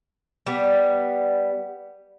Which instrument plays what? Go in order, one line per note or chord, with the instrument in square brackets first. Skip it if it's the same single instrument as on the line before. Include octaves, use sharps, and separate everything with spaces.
[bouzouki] G3 B3